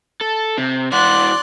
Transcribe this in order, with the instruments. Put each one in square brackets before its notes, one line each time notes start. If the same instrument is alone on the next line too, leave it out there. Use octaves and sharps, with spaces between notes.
[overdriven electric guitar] A4
C3
[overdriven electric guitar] E3 F#4 [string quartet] D5 C6 F#6